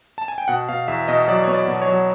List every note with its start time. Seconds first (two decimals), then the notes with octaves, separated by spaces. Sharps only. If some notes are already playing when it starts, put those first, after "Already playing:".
0.18 A5
0.28 G#5
0.38 G5
0.48 B2 F#5
0.69 B2 F5
0.88 E2 E5
1.08 B2 D#5
1.28 F#3 D5
1.44 B3 C#5
1.54 D5
1.68 B2
1.82 C#5
1.88 F#3